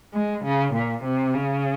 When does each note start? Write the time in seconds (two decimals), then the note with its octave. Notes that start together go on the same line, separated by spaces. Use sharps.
0.14 G#3
0.44 C#3
0.74 A#2
1.04 C3
1.34 C#3